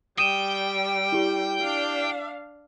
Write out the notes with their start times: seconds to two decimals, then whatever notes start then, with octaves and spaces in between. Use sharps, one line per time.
0.18 G3 G5 D#6 D#7 E7
1.12 E4 G4
1.62 D4 F5